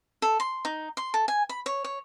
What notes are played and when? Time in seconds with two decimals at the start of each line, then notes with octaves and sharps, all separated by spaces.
0.22 A4
0.40 C6
0.65 D#4
0.97 C6
1.14 A4
1.28 G#5
1.49 B5
1.66 C#5
1.84 C#5